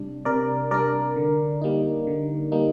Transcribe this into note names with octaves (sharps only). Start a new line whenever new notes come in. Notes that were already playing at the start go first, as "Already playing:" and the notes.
Already playing: C3 G3 D4
C3 A#4 D5
G3 D4 A#4 D5
D3
G3 A#3 D#4
D3
G3 A#3 D#4